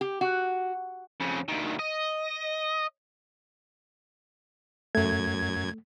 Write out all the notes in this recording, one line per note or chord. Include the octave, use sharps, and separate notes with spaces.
G4
F#4
F2 C#3
D2 D#3
D#5
F#2 A3 G#6